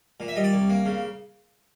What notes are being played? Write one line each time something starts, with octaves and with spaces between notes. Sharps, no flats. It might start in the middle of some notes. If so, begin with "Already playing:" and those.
A#2
E5
G3 D#5
D5
C2
A#3
C#3